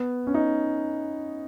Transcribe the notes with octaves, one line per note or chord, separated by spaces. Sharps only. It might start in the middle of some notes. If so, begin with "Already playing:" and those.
Already playing: B3
C#4
D#4